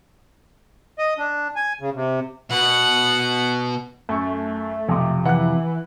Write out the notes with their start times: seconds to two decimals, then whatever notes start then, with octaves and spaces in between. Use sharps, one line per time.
0.99 D#5
1.18 D4
1.56 G#5
1.81 C#3
1.94 C3
2.51 B2 F#5
4.09 F#2 A3 C#6
4.89 B1 F2 C3
5.25 E3 F#5 F#6